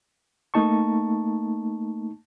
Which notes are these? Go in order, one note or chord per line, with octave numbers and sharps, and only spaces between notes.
A3 A#3 D#4 A5 C#6